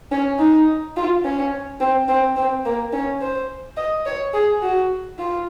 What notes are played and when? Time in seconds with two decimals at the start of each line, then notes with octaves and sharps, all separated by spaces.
0.11 C#4
0.39 D#4
0.97 F4
1.25 C#4
1.80 C4
2.08 C4
2.36 C4
2.65 A#3
2.93 C#4
3.21 C5
3.77 D#5
4.06 C#5
4.34 G#4
4.62 F#4
5.18 F4